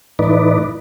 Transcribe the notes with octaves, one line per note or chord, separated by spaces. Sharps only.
A2 E3 D#4 B4 D5